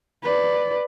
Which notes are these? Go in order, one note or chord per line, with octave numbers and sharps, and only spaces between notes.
B4 D5